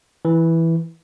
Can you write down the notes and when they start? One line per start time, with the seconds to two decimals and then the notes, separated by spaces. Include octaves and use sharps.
0.25 E3